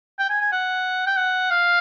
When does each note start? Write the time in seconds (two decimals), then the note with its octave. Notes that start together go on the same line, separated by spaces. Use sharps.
0.19 G5
0.29 G#5
0.40 G#5
0.52 F#5
1.07 G5
1.17 F#5
1.51 F5